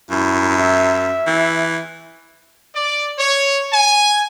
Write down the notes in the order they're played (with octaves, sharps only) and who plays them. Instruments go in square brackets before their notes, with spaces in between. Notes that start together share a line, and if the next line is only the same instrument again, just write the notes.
[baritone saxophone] F#2 [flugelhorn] E4
[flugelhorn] E5
[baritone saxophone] E3
[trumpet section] D5
C#5
G#5